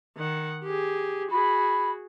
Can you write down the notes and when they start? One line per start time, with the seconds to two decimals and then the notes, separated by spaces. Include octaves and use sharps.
0.17 D#3 F#5
0.64 G4 G#4
1.31 F#4 G#4 B5